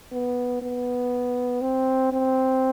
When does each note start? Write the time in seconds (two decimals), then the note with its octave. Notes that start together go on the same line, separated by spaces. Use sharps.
0.12 B3
0.62 B3
1.61 C4
2.12 C4